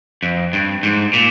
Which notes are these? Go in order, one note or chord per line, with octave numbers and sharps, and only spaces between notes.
F2
G2
G#2
A#2